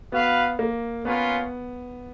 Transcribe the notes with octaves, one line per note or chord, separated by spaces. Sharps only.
B3 F#4 B4 F5
A#3
A#3 B3 C#4 F4 B4